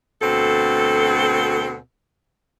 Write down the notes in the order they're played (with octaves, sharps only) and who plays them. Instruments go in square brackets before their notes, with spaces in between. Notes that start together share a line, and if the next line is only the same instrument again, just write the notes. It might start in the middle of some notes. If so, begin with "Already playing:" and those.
[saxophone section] D2 B2 C4 A4